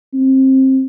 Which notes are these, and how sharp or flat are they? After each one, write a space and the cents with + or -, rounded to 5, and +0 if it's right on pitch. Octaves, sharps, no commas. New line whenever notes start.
C4 +20